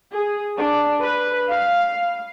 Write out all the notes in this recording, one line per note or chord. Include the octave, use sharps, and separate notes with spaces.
G#4
D4
B4
F5